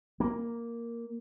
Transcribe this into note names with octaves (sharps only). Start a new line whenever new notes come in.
A#3